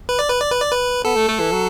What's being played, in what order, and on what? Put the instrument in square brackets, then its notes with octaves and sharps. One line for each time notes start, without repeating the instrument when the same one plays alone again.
[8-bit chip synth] B4
D5
B4
D5
B4
D5
B4
[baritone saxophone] B3 [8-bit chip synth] A4
[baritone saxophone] A3
A3
E3
F#3